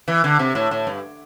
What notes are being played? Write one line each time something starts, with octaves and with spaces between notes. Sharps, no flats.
E3
D3
C3
A2
A2
G2